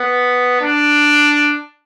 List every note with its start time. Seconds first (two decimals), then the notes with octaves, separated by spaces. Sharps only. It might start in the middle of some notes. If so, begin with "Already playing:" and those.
Already playing: B3
0.61 D4